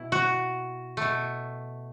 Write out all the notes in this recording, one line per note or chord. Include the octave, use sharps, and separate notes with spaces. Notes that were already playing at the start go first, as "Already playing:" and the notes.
Already playing: B2 E4
F#4
B2 A3